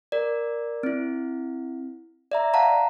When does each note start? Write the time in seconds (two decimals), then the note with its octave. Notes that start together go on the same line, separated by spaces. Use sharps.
0.12 A#4 D5
0.83 C4 E4
2.32 D5 E5 A#5
2.54 F5 F#5 A5 A#5